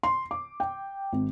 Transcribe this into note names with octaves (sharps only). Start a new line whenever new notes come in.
C6
D6
G5
G#1